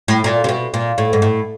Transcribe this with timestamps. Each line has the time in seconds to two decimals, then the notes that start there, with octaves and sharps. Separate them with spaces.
0.08 A2
0.24 A#2
0.44 C3
0.49 B2
0.74 A#2
0.98 A2
1.13 G#2
1.22 A2